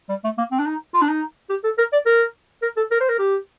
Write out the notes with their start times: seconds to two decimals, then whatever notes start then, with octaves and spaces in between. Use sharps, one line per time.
0.09 G3
0.24 A3
0.38 A#3
0.51 C4
0.59 D4
0.66 D#4
0.94 F4
1.01 D4
1.08 D#4
1.49 G4
1.64 A4
1.78 A#4
1.93 D5
2.06 A#4
2.62 A#4
2.77 A4
2.91 A#4
3.00 C5
3.09 A#4
3.18 G4